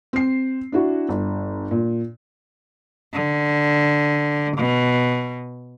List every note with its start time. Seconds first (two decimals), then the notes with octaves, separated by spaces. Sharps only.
0.13 C4 C7
0.72 D4 E4 F#4
1.09 G1
1.71 A#2
3.13 D3
4.57 B2